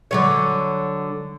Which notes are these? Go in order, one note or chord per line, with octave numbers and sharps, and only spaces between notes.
D3 F#3 C#5